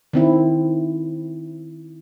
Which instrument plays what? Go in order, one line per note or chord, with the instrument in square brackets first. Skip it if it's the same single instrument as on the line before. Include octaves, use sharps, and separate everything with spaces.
[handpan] D#3 C4 E4